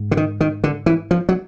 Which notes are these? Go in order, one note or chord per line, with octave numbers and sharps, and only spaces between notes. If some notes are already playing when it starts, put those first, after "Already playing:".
Already playing: G#2
D3
D#3
D#3
D3
E3
F3
F#3